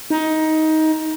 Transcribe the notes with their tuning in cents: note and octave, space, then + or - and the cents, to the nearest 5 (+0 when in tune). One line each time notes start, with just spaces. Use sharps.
D#4 +15